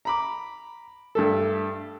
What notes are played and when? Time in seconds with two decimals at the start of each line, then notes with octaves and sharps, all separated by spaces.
0.05 A#5 B5 D6
1.15 G2 A3 A4